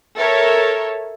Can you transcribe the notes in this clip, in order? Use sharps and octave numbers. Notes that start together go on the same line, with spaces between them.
A4 A#4 C#5 E5